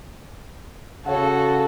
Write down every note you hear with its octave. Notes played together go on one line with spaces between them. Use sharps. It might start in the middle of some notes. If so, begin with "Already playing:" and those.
C#3 F#4 A4 C#5 F5 F#5